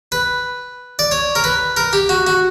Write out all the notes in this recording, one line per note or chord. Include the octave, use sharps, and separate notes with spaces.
B4
D5
C#5
A#4
B4
A#4
G4
F#4
F#4